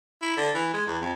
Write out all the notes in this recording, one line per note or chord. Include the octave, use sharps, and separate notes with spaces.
E4
D3
E3
G#3
E2
F2